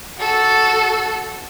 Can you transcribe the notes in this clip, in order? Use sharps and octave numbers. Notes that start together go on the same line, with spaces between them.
F#4 A4